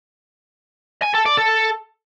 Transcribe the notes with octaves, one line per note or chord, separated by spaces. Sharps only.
G#5
A4
D5
A4